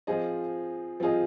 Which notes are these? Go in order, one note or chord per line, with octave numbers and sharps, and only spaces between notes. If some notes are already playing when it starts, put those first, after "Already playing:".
F3 C4 F4 G#4 D#5
F3 C4 F4 G#4 D#5